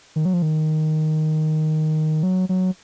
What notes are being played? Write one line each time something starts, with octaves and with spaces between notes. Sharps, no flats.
D#3
F#3
F3
D#3
F#3
F#3